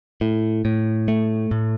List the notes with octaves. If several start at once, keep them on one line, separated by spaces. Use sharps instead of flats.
A2
A2
A3
A2